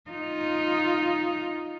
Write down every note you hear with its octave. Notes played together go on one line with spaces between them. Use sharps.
D#4 F4